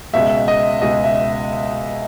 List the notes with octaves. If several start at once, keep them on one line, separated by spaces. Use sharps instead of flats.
C#2 B2 G#3 E5
D#5
C#2 B2 G#3 D#5
E5